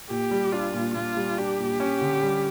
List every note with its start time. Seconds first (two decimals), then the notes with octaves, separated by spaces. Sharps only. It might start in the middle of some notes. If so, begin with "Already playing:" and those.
0.10 A#2 G4
0.31 G3
0.52 D4 F4
0.73 A#2
0.95 A#2 F4
1.17 G3
1.38 D4 G4
1.60 A#2
1.80 C#4
2.01 D3
2.23 G3